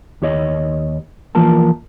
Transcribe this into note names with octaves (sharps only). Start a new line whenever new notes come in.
D#2 G4 C#5 D#5
E3 F3 A#3 F4 A#4 A5